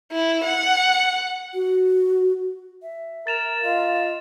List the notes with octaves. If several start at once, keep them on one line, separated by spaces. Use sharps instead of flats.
E4
F#5
F#4
E5
A#4 A6 E7 F7
F4 D#5 F5